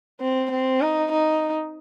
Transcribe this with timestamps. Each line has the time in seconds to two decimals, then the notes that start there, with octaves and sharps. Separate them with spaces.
0.21 C4
0.51 C4
0.81 D#4
1.12 D#4